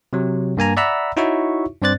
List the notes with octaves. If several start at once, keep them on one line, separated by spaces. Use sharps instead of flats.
C3 F#3
G2 A#3 G#5 A#5
D5 E5 F#5 A#5 B5 E6
D#4 E4 F#4 C#5 E5 C#6
G2 C4 C5 D5 F#6 A6